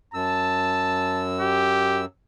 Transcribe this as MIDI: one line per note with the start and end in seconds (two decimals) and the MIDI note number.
0.14 2.05 42
0.14 1.25 81
0.14 2.05 88
1.41 2.03 67